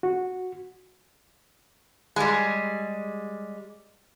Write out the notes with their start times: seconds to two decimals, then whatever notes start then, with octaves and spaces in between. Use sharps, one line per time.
0.03 F#4
2.16 G3 G#3